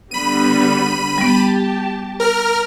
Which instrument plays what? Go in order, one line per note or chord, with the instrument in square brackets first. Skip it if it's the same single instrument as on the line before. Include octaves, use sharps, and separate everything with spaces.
[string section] D3 G3 B3 [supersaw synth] B5 D#7
[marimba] G3 B3 [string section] G4 A5
[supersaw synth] A#4 F6